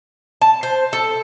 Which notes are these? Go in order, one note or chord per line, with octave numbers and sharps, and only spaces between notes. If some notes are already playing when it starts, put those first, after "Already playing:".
A5
C5
A4